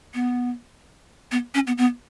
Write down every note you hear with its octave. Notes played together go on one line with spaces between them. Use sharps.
B3
B3
C#4
B3
B3